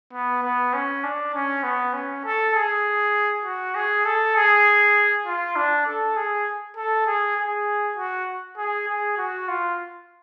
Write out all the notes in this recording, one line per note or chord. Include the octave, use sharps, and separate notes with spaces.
B3
B3
C#4
D4
C#4
B3
C#4
A4
G#4
F#4
G#4
A4
G#4
F4
D4
A4
G#4
A4
G#4
G#4
F#4
G#4
G#4
F#4
F4